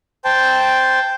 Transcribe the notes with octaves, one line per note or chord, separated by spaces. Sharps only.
C5 G5 A5